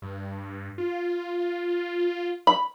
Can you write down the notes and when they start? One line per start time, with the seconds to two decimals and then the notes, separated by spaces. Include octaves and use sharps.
0.02 G2
0.78 F4
2.47 B5